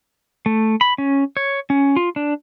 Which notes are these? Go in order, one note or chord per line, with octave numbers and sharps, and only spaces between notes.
A3
B5
C#4
C#5
C#4
F4
D4